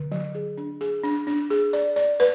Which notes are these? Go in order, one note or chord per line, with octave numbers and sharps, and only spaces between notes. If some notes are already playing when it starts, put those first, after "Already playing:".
Already playing: D3
F#3
G#4
D4
G#4
D4
D4
G#4
D5
D5
B4